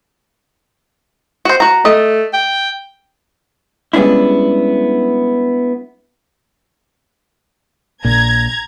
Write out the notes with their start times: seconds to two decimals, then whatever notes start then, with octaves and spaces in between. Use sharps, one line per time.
1.45 F#4 C5
1.60 F#4 A#5
1.85 A3 D#5
2.33 G5
3.93 G3 G#3 B3 C#4 D4 E4
8.05 A#1 A#2 A#5 G#6